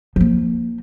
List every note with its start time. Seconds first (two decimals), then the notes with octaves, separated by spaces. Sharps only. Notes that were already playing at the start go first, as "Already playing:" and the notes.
0.16 F3 A#3